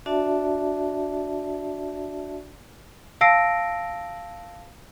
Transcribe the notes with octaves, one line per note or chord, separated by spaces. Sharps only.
D4 F#4 D5 E5 A5
F5 A5 E6 A#6 C7 D7